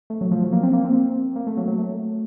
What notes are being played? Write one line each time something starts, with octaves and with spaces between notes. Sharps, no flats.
A3
F#3
F3
F#3
A#3
C4
A#3
C4
A#3
A3
F#3
F#3
A3